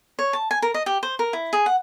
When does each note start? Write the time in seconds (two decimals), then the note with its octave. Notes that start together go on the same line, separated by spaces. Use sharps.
0.19 C#5
0.33 A5
0.51 G#5
0.62 A#4
0.74 D#5
0.86 G4
1.03 C5
1.19 A#4
1.33 E4
1.53 G#4
1.66 F#5